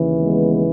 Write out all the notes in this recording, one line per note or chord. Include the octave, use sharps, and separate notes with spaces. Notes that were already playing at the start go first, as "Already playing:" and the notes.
Already playing: D#2 C#3 E3
G#3 B3